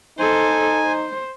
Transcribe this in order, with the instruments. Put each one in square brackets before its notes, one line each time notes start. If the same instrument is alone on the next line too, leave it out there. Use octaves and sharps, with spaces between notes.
[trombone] D#4 [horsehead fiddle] A4 C5 [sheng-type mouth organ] G#5
[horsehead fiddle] C5